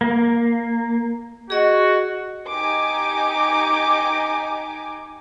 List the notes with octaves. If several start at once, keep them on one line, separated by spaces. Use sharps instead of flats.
A#3
F#4 G#4 D#5
D#4 G4 G#5 D6